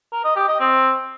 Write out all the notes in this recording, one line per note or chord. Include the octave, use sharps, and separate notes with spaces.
A#4
D#5
G4
D#5
C4